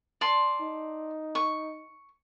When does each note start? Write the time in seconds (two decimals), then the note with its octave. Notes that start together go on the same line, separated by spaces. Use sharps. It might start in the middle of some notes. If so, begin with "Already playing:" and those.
0.21 D5 A5 C6
0.61 D#4
1.35 C#6